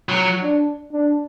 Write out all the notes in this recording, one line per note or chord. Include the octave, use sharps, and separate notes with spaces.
F#3
D4
D4